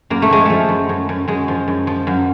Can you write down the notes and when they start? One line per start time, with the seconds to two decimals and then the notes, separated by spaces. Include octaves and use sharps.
0.10 F#2 A#3
0.22 A3
0.30 F3 G#3
0.45 F3 A3
0.69 F#2
0.89 F#2
1.09 F#2
1.28 F#2 G#3
1.48 F3
1.68 F#2
1.87 F3
2.07 F#2